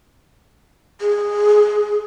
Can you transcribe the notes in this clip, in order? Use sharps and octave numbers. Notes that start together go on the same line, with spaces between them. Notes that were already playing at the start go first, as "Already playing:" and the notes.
G#4